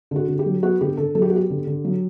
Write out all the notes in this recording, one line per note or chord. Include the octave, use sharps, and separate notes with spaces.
D3 F#4
D3
G4
F#3
B3 F#4
D3 G4
D3 A4
F#3 A4
G4
F#4
B3 G4
D3
D3
F#3